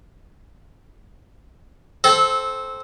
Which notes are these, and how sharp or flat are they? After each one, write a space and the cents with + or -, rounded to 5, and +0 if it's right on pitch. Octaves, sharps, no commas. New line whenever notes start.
C4 +0 A4 -25